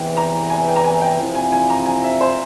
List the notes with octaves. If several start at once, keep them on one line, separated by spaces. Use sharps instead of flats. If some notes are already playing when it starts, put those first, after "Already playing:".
Already playing: E2 C3 E3 G5
A#5
G#5
G5
A#5
G#5
G5
C3 F3 C4 E4
G#5
G#5
A#5
G#5
E5
C5